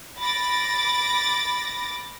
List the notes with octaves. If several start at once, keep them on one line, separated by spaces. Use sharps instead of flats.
B5 D6 A6 A#6 D7